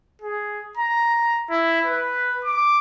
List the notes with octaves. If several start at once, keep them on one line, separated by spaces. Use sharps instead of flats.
G#4
A#5
E4
B4
D6